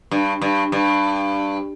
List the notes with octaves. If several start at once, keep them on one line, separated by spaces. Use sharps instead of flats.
G2
G2
G2